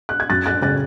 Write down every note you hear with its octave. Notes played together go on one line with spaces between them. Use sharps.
F#6
G#6
F#2 F#6 A6
F#6 A6
C#3 F#6 A6